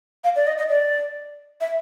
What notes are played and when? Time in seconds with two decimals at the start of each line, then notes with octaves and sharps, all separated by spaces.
0.24 F5
0.36 D5
0.47 D#5
0.58 D#5
0.69 D5
1.61 E5